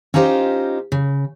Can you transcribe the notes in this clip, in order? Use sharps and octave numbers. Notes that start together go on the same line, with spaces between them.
C#4 D#4 F4 G4 C5 D#5
C#3